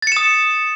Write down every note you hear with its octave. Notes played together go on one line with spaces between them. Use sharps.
D#6 A6 C#7 E7